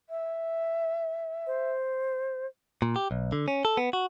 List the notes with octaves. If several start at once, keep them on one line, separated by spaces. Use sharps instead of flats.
E5
C5
A#2
G4
B1
D3
C#4
A4
B3
F#4